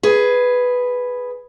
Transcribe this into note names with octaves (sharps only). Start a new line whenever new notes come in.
G#4 B4